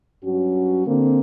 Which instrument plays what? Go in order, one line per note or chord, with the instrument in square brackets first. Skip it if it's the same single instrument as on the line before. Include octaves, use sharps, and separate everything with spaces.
[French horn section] G2 F#3 C#4 F#4
D3 A#3 C4